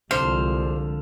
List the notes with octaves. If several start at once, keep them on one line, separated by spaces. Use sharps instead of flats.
C2 D3 F3 G#3 D4 C5 F5